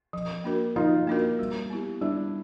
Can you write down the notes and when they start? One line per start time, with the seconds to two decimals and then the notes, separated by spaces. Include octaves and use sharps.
0.13 F3
0.44 A#3 D4 F#4 A#4
0.76 F3 D#4 F4
1.07 A#3 D4 F#4 A#4
1.39 G3
1.70 B3 E4 G4
2.01 G3 D4 E4